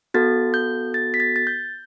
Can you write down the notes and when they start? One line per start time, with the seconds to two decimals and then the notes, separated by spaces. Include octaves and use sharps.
0.14 B3 F#4 A4 A6
0.54 G6
0.94 A6
1.14 B6
1.20 A6
1.36 A6
1.47 G6